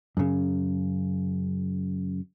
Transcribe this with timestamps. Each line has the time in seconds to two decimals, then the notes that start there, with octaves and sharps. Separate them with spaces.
0.17 F#2 C#3